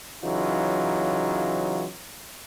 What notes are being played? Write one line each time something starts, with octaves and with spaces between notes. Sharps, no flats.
C#3 E3 F#3 D#4 F4